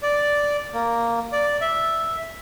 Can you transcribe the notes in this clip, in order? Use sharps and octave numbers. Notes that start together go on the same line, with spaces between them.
D5
A#3
D5
E5